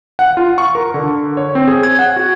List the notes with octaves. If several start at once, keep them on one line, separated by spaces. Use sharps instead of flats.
F#5
F4
C#6
A#4
D3
C#5
C4
G#4
G#6
F#5
F#4